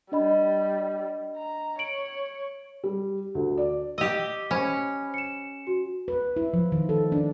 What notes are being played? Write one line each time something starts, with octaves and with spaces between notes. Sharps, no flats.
G3 D4 D#5 B5
A#5
C#5 D7 F#7
G3
D2
D5
G4 D#5 E6
C#4 C5 B5
C#7 E7
F#4
B4
E4
F3
D#3
A4
D4